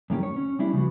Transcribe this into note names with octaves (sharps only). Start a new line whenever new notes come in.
F#2 A2 D#3 C#4 G4
C#5
C#4
G3 C#4 D4 E4 G4
C#3 F3 B3 F#4